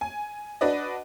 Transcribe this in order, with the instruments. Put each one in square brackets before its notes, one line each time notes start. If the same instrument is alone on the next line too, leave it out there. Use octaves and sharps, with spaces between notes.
[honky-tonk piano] G#5
D4 F#4 B4 D5 D#5